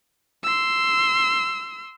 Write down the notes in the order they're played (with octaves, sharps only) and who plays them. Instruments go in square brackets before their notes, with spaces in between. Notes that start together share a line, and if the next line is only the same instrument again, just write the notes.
[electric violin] C6 E6